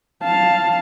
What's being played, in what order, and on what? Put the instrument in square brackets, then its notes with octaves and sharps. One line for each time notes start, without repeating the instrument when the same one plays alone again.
[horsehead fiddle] F5 A5